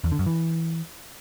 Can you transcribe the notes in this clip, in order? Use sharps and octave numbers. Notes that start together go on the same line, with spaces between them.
E2
D3
F#2
E3